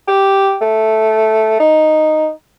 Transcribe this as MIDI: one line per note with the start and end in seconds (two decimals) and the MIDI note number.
0.08 0.56 67
0.61 1.57 57
1.60 2.29 63